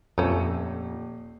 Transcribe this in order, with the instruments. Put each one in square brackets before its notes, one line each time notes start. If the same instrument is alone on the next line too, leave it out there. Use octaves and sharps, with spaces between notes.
[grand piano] D#1 [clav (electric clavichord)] F2 [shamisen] A3 C#4